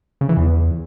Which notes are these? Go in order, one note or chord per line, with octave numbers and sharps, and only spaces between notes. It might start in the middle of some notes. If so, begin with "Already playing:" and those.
C#3
E3
E2